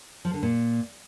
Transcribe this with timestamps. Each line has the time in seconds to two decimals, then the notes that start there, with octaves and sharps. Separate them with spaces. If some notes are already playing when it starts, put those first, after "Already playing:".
0.25 F3
0.34 D3
0.43 A#2